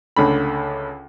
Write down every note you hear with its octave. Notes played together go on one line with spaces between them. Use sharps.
C#2 D3 A3 B5